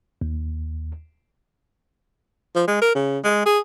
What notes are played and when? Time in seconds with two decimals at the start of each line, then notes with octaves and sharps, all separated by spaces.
0.21 D#2
2.55 F3
2.68 G#3
2.82 A#4
2.95 C#3
3.24 G#3
3.46 G#4